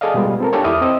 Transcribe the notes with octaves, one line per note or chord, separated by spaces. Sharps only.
G#4 A4 D5 D#5 F5
B2 G3 G#3 B3 F4
C4 A4 A#4
D4 F4 G4 A4 C#5
E2 E4 E5 D6 D#6 F6
C4 D#5 E6